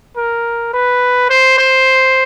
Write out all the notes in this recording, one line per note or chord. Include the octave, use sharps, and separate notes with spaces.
A#4
B4
C5
C5